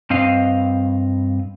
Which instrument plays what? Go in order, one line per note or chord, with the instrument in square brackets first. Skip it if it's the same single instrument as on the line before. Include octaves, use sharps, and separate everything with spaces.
[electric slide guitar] G2 C4 D#5 F5